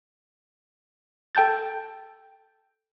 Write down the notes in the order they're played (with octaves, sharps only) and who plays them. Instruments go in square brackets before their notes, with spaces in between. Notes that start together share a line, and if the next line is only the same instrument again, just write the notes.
[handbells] A4 G5 A5 G6 A6